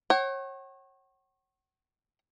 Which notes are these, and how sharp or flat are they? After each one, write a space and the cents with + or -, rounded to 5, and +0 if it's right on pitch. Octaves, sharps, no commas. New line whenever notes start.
C#5 -35 F#5 +45